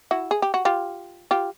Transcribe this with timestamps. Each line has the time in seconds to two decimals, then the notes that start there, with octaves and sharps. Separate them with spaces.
0.11 E4 F#4
0.31 G#4
0.42 G4
0.54 F#4
0.65 F4 G4
1.31 F4 G4